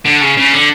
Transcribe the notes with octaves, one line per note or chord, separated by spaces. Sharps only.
D3
C#3
C#3
D3